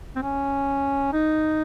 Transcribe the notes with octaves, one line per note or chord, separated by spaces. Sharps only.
C4
C#4
D#4